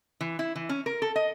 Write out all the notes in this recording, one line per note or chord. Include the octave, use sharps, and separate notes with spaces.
E3
E4
E3
C#4
A#4
A4
D#5